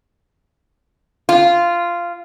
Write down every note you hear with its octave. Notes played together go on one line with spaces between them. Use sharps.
F4